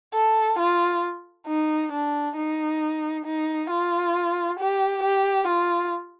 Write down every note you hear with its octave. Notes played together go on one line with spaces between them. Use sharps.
A4
F4
D#4
D4
D#4
D#4
F4
G4
G4
F4